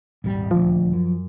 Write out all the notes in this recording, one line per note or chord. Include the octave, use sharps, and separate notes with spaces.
D#1 G#1 G3
D#1 D2 F3
F#2